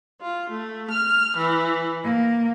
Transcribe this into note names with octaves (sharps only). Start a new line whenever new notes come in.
F4
A3
F6
E3
A#3